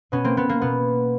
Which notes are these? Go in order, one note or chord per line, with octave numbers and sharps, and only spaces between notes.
B2 B3 C#4
A#3 C4
B3
A#3
B2 B3